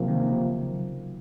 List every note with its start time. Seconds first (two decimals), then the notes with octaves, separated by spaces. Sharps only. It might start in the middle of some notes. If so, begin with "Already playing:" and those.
Already playing: C3 F3 F#3 A#3
0.08 D#3
0.17 C#3